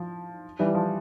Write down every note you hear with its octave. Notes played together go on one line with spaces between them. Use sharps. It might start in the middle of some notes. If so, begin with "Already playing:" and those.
Already playing: F3
E3 G3
F3